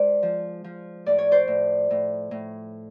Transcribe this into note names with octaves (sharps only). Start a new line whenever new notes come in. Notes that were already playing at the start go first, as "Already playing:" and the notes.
Already playing: G#3 C5 D5
F3
F3
A2 D5
C#5
C5 D5
A2
A2
A2